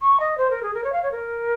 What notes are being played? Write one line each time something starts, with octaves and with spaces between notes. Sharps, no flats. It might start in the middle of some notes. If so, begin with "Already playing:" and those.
C#6
D#5
C5
A#4
G#4
A#4
C#5
F5
C#5
A#4